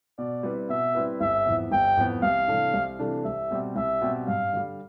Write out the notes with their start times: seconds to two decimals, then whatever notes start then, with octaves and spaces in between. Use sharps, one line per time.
0.18 B2 D5
0.43 G3 C4 E4 B4
0.69 B2 E5
0.95 G3 C4 E4 B4
1.21 G1 E5
1.46 F2 E3 B3
1.71 G1 G5
1.97 F2 E3 B3
2.23 C2 F5
2.48 C3 E3 A3 D4
2.74 C2
2.99 C3 E3 A3 D4
3.24 C2 E5
3.51 B2 G3 C4 G4
3.76 C2 E5
4.02 B2 G3 C4 G4
4.27 G2 F5
4.53 D3 G3